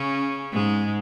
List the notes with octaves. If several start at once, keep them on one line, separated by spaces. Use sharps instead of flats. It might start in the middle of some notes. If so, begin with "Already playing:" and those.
Already playing: C#3 C#4
G#2 G#3